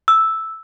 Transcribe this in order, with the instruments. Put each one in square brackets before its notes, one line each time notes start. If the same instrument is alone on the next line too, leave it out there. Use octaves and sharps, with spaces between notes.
[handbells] E6